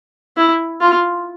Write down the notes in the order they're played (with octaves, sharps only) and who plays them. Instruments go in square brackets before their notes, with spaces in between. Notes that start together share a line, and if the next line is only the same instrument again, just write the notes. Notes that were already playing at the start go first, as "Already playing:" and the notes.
[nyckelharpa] E4
F4